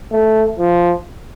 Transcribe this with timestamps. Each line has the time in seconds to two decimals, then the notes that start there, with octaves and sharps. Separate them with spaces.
0.12 A3
0.59 F3